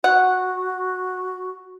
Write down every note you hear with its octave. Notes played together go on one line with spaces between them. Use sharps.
F#4 F#5